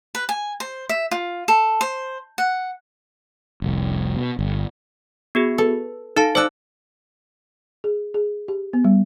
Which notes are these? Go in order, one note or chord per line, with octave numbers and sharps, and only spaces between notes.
B4
G#5
C5
E5
F4
A4
C5
F#5
F1 C2
B2
G1
B3 F#4 G#4
A4 B4
D#4 A4 F5 A5
C5 D5 A5 E6 F#6
G#4
G#4
G4
B3
G3